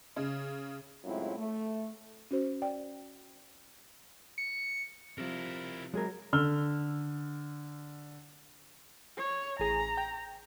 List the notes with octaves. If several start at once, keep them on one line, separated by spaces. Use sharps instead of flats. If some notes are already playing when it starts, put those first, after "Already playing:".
C#3
F#2 A2 G#3 C4 E4 F4
A3
C#4 F#4 C5
D5 G5
C#7
C3 F3 E4 A#4
F#3 G#3 G#4 A#4
D3 E6 F6 G7
C#5
A1 G#4 A#5
G5